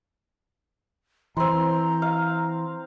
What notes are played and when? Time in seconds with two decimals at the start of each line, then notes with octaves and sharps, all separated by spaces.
1.37 E3 C4 A#5 C6
2.02 F5